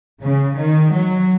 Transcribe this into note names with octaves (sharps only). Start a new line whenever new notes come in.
C#3
D#3
F#3